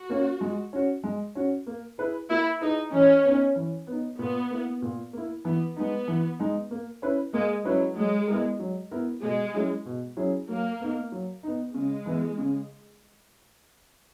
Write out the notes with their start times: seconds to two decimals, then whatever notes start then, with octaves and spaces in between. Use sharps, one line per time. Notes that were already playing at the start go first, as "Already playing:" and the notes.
Already playing: F#4
0.09 A#3 C#4
0.41 G#3
0.73 C#4 F#4
1.04 G#3
1.35 C#4 F#4
1.67 A#3
1.98 E4 G#4 B4
2.30 A#3 E4
2.61 D#4 E4 G#4 B4
2.93 E3 C#4
3.24 B3 D#4
3.56 E3
3.87 B3 D#4
4.18 A#2 B3
4.51 A#3 E4
4.82 A#2
5.13 A#3 E4
5.45 E3 B3
5.76 G#3 B3 D#4
6.08 E3
6.39 G#3 D#4
6.71 A#3
7.02 C#4 E4 B4
7.34 G#3 A#3
7.65 F#3 C#4 E4 B4
7.96 F#3 G#3
8.28 B3 E4 A#4
8.60 F#3
8.91 B3 E4 A#4
9.23 B2 G#3
9.54 F#3 C#4 E4 G#4
9.85 B2
10.17 F#3 C#4 E4 G#4
10.48 F#3 A#3
10.80 B3 D#4
11.12 F#3
11.43 B3 D#4
11.74 C#3 G#3
12.06 E3 B3 E4
12.38 C#3